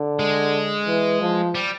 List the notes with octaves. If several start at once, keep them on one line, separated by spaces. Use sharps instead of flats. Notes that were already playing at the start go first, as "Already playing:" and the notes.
Already playing: D3
G#3
E3
F3
G3